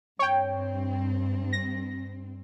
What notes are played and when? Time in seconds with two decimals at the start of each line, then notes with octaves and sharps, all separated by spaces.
0.19 G2 C4 C#5 G5
1.53 A#6